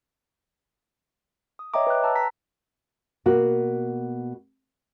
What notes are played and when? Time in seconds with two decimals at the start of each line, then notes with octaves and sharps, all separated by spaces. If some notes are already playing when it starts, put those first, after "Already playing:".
1.59 D#6
1.74 C#5 D#5 E5 G5 A#5 D6
1.87 B4 G5 F#6
2.04 A5 A#5 E6
2.16 A#5 B6
3.26 B2 A#3 F#4